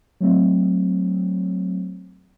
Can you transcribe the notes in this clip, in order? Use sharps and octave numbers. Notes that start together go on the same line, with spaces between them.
F#3 A3 C4